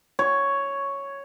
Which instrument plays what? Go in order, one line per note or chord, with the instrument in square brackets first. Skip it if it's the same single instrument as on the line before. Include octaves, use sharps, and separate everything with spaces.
[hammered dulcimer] C#5